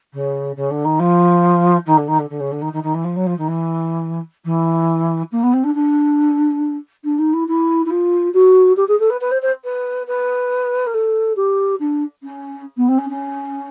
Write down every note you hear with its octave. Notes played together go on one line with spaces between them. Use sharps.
C#3
C#3
D3
D#3
F3
D#3
D3
D#3
D3
D3
C#3
D3
D#3
D#3
D#3
E3
F3
F#3
F3
D#3
E3
E3
A#3
B3
C4
D4
D4
D4
D#4
E4
E4
E4
F4
F#4
G4
G#4
A4
B4
B4
C5
C5
B4
B4
A#4
A4
G4
D4
C#4
B3
C4
C#4
C#4